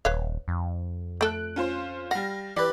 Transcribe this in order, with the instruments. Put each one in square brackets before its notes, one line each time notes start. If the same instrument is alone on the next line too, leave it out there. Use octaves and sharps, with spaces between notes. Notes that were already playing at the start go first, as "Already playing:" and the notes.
[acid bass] D#1 [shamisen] B4 C#5 F5
[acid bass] F2
[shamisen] A3 A4 [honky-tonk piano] F#6 D7
[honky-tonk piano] C#4 F4 C5
[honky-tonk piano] G3 A#6 [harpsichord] F5 [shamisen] F#5
[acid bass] E3 [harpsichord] G4 B4 [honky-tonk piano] D5